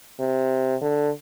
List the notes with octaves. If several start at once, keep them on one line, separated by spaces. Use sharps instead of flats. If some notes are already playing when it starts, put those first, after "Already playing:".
C3
D3